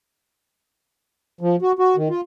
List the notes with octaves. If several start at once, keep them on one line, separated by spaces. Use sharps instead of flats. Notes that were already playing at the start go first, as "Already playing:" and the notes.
F3
F#4
F#4
D#3
F4